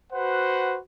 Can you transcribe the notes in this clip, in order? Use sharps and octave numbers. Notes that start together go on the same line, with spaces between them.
F#4 B4 C5 F#5